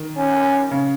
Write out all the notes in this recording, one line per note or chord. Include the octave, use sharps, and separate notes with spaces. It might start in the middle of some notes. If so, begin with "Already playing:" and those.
Already playing: D#3
C#4
C#3